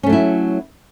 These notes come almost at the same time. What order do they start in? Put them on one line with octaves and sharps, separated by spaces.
C#4 A3 F#3 E4